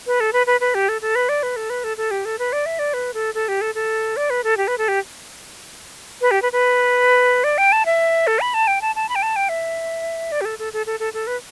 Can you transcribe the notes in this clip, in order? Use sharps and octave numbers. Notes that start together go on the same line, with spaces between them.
B4
A4
B4
B4
B4
G4
A4
A4
B4
D5
B4
A4
B4
A4
A4
G4
A4
B4
D5
E5
D5
B4
A4
A4
G4
A4
A4
D5
B4
A4
G4
B4
A4
G4
B4
G4
B4
B4
D5
G5
A5
E5
A4
B5
A5
G5
A5
A5
B5
G5
A5
G5
E5
D5
G4
A4
A4
A4
A4
A4
A4
B4